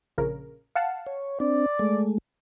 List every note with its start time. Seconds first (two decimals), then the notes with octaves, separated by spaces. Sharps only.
0.18 A#1 C#3 A#4
0.75 F5 F#5 A5
1.06 C#5
1.40 C4 D4 D5
1.79 G#3 A3